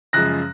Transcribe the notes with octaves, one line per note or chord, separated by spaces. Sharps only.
F#2 C#3 F3 G#3 F#6 A#6